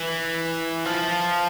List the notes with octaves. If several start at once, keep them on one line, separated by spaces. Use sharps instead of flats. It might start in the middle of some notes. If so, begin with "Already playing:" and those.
Already playing: E3
F3